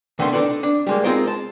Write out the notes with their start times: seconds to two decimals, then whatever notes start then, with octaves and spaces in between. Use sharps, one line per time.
0.19 C2 D3 D#3 A3 B3 C6
0.33 D4 D#4 G4 A4 B4 D5
0.63 D4
0.87 G3 G#3 A#3
1.04 G#3 C4 D#4 F4 A#4 C5
1.27 A5